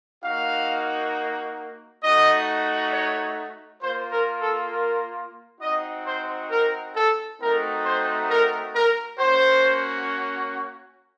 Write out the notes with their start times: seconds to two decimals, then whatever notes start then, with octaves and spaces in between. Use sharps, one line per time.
0.24 A#3 D#4 F#4 F5
2.03 A3 D#4 F#4 D#5
2.93 C#5
3.82 A#3 F4 C5
4.12 A#4
4.41 A4
4.72 A#4
5.61 C4 D#4 F#4 D#5
6.06 C5
6.51 A#4
6.95 A4
7.40 A3 C4 D#4 F#4 A#4
7.84 C5
8.30 A#4
8.75 A#4
9.19 A#3 C#4 F#4 C5